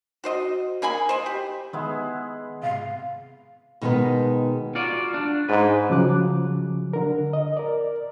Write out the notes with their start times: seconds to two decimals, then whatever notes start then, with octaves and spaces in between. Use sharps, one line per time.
0.24 F#4 C5 D#5
0.82 A#3 G#4 G#5 B5
1.09 C5 D#5
1.26 G4
1.73 D#3 G#3 B3 E4
2.63 G#2 C3 F5
3.81 B2 D#3 G#3 B3 B4
4.75 F4 F#4 D5
5.14 D4
5.49 G#2 B4
5.90 C#3 F3 F#3 D6 F#6
6.93 D3 A#4
7.33 D#5
7.57 A#4 D5